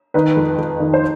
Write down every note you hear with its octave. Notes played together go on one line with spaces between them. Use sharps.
D#3 B4
F2
F2
D#3
C5